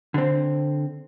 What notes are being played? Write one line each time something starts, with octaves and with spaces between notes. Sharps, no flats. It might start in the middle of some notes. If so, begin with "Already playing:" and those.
D3 C4